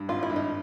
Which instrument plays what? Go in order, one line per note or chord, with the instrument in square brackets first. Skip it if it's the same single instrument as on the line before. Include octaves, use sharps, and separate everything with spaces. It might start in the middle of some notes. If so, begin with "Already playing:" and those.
Already playing: [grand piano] G2
[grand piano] G#1 [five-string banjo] F4
[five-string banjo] E4
[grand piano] G2
[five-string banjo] D#4